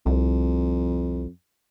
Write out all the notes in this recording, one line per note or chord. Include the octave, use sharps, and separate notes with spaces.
C2 F2